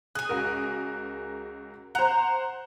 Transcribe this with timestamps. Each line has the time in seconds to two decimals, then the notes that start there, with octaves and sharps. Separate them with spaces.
0.15 G#4 G#5 F#6
0.29 C#2 F#4 A#4
1.95 C5 F#5 A#5